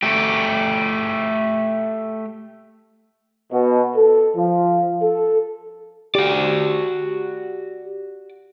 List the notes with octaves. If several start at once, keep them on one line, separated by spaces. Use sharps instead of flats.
A3 G4
B2
A4
F3
A4
F#4 G4 D5